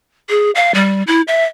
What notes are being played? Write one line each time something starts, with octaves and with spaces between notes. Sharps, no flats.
G#4
F5
G3
E4
E5